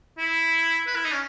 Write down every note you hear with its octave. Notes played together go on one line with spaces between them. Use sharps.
E4
B4
E4
D#4
C#4